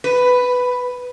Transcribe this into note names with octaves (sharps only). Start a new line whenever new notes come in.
B4